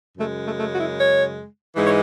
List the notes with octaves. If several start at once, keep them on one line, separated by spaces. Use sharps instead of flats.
F#2 C#3 G#3 A3
A3
A3
F#4
E4
C#5
G#2 E3 G#3
C#5